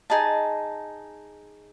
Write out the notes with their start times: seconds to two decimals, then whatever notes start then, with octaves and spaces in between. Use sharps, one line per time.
0.10 D#4 G#4 D#5 A5